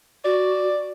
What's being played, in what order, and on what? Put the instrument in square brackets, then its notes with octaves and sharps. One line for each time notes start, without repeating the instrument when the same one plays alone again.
[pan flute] F#4 [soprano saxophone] D5